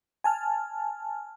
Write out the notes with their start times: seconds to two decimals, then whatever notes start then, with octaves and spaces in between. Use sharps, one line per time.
0.24 G#5 A5 F6